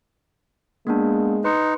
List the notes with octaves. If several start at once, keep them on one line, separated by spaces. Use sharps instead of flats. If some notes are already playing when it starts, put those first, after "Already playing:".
G#3 A#3 B3 D4
D#4 B4 C6 C#7